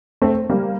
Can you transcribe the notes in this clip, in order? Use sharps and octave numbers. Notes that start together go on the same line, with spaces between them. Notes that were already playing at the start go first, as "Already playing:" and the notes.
A3 C4
G3 A#3